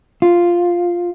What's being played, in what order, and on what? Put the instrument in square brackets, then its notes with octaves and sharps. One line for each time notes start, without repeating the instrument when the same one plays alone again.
[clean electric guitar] F4